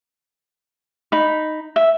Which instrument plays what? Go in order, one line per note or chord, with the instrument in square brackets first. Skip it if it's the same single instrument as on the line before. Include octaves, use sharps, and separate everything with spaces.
[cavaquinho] D#4 B5
E5